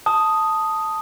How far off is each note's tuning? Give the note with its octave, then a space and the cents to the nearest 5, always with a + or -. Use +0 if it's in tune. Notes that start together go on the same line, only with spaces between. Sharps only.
A5 +0 D#6 +0